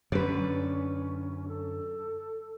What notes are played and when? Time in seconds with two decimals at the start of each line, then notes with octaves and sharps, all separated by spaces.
0.12 F#2 D3 C#4 B4 D5
1.48 A4